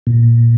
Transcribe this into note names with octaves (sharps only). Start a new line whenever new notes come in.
A#2